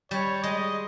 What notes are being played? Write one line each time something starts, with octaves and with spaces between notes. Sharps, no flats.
G3 C#5
G#3 D#5